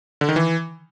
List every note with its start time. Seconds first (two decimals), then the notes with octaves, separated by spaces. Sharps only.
0.21 D3
0.29 D#3
0.36 E3